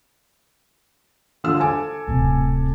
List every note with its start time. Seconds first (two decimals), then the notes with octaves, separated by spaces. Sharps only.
1.44 D3 F4 E6
1.60 A4 G#5 D6
2.08 D1 C3